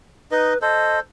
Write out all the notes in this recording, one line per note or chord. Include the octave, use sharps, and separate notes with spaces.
D#4 B4 D#5
A4 C5 D#5